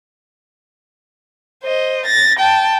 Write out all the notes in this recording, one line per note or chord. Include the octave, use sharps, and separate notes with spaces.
C5 D#5
A6 A#6
G5 A5